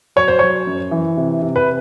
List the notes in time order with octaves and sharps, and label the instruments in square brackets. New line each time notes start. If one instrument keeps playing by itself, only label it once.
[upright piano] F#3 C#5
C5
F#3 C#5
F#2
E3
C3
C3
B4